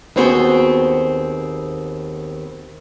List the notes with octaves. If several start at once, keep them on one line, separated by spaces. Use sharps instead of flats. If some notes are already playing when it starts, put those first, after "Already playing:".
D#2 B3 C4 F#4 G#4 C5